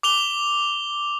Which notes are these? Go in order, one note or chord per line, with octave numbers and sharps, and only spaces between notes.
D6 F7 G7